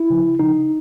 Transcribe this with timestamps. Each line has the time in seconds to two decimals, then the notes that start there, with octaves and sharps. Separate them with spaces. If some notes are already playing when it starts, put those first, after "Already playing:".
Already playing: E4
0.10 C#3 F3
0.39 C#3 F3 D#4